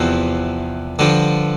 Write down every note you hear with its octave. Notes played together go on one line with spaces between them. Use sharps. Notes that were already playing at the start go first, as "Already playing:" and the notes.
Already playing: E2 C3 F3
G2 D3 F3